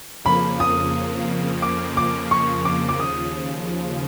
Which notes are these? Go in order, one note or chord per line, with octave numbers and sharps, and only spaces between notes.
F2 C#3 F3 A#3 B5
D#6
D6
D6
C#6
D6
D6
D#2 C#3 F3 D#6